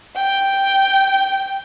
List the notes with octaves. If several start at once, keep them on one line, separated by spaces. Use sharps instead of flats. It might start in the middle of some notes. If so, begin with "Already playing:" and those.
G5